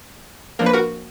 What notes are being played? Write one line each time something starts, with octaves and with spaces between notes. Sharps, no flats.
F3 A#3 D4 A#4
B4
F#4 A#4